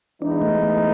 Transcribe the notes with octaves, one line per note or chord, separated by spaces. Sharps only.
E3 G#3 B3 D4 D#4
A3
A3